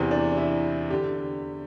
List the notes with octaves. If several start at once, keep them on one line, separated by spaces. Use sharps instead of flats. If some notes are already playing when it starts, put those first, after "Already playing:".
Already playing: E2 C3 E3 C4
D4
E4
D3 G4